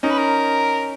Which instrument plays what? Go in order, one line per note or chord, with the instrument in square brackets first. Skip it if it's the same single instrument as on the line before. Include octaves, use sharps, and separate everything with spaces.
[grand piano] C#4 D#4 [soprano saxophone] A#4
[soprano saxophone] B4
A#4